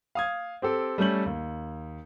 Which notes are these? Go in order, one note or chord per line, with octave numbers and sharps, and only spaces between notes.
F5 D#6 G#6
C4 G4 A4
G3 A3 C#4 A4 G6 F#7
D#2